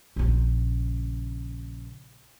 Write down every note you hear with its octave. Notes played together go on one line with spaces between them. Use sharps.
A#1 C#3